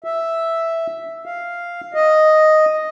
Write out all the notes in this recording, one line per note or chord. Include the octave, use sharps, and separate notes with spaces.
E5
F5
D#5